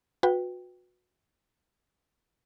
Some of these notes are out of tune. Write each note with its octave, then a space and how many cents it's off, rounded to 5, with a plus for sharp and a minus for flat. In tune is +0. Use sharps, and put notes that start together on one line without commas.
F#4 -30 B4 +0 G5 +0